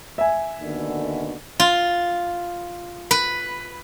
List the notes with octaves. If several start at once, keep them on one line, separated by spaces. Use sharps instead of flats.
E5 G#5
D#2 B2 D3
F4
B4